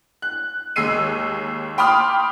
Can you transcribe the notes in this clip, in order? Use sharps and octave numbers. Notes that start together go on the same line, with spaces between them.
F#6
D#2 G#3 E6 C7 D#7
G5 B5 C6 D6 D#6 F6